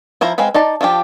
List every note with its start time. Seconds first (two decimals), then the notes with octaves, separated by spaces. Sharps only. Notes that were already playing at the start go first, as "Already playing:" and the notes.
0.21 F3 E4 C5 F5 A#5
0.38 G#3 C4 B4 F5 B5
0.54 D#4 D5 A5
0.81 F3 D4 F4 G4